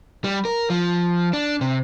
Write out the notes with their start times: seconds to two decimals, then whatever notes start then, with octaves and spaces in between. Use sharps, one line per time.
0.24 G3
0.45 A#4
0.70 F3
1.33 D4
1.61 C3